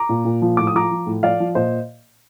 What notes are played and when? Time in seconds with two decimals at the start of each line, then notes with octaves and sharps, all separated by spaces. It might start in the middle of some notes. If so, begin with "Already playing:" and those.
Already playing: A#5 D6
0.09 A#2
0.25 A#2
0.42 F3
0.57 A2 D6
0.67 D#6
0.74 F3 A#5 D6
0.91 F3
1.07 A2
1.23 F3 D5 F5
1.40 F3
1.55 A#2 C5 D#5